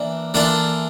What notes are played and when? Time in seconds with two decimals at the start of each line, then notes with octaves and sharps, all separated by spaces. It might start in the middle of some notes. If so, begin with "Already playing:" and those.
Already playing: E3 A#3 D4
0.34 E3 A#3 D4 F4 A4